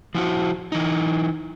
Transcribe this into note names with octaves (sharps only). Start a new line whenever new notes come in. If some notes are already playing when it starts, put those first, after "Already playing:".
F3 E4 F#4
E3 D#4